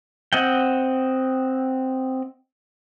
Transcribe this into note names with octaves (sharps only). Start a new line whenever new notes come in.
C4 D#5 F#5 G5